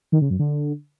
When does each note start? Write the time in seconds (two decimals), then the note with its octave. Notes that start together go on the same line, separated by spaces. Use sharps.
0.12 D#3
0.21 C#3
0.30 F#2
0.39 D3